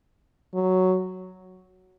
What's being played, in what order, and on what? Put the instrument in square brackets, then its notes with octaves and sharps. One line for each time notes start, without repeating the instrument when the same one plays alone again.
[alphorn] F#3